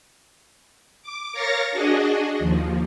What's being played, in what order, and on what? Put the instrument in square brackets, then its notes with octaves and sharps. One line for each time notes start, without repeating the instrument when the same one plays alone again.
[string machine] D6
A#4 C#5 F5 C#6 A6 A#6
D4 F#4 G#4 D#5
D#2 F3